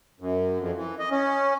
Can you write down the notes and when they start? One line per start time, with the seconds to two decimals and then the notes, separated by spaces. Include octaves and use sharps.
0.20 F#2
0.59 F2
0.76 E3
0.99 D#5
1.11 C#4